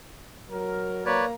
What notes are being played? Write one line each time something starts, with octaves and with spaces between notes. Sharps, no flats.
F#3 A#4
A#3 B4 C#5 D5 A#5